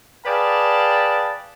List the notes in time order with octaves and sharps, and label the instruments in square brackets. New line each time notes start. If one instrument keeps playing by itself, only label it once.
[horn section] G#4 B4 D5 F5 G5 A5